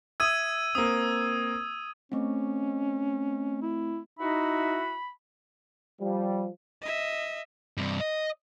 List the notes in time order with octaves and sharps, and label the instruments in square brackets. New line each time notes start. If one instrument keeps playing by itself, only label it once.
[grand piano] E5 D#6 [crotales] E6 G#6 D#7
[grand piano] A#3 C4 [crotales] D#6
[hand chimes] A3 C4 [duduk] C#4
[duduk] E4
[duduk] D#4 [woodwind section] E4 F#4 E5 [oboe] B5
[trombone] F3 [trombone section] G3
[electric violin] D#5 E5
[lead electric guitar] G2 C3
D#5